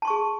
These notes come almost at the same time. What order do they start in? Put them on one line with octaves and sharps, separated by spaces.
A5 C6 C#6 G#4